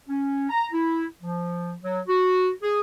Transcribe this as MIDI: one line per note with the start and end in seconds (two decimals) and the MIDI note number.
0.08 0.49 61
0.50 0.67 82
0.72 1.05 64
1.21 1.74 53
1.82 2.00 54
2.07 2.50 66
2.63 2.81 68